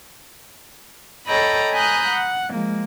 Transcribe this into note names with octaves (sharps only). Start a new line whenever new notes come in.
A4 C#5 D#5 G5 A#5 B5
G#5 A#5 B5 D#6 F#6 G6
F#5
F3 G#3 A#3